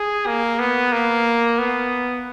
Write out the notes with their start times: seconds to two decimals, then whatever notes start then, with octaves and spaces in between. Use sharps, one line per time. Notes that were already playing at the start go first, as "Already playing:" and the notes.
Already playing: G#4
0.27 A#3
0.59 B3
0.92 A#3
1.59 B3